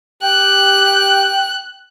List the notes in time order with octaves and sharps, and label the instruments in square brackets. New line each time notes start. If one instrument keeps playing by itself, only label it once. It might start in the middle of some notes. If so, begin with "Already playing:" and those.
[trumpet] G4 [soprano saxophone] G5 [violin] F#6